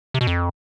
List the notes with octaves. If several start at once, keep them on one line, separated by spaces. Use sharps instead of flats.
C3
B2
F2